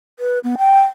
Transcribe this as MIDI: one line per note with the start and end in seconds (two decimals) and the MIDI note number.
0.19 0.39 71
0.44 0.55 59
0.58 0.81 79